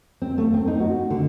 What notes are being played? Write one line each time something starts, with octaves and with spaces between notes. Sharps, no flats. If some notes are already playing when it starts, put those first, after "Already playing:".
C4
A3
C4
D#4
F#4
D3